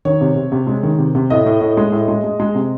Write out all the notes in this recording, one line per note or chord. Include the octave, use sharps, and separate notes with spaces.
D#3 C#5
C3
C3
C3
G#3
D#3
C3
C3
A2 D#5
A2
A2
G#3
A2
G#3
G#3
G#3
C3